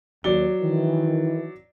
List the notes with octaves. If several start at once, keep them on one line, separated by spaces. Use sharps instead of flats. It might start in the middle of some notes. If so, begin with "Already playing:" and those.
D#2 F#3 D5 G7
D#3 E3